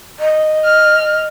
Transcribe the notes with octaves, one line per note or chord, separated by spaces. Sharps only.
D#5
F6